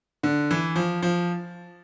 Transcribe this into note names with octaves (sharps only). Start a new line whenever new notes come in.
D3
E3
F3
F3